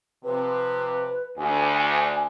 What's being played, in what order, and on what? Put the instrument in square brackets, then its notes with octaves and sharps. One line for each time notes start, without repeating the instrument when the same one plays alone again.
[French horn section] C3 F3 [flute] B4
[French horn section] D2 [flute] G#5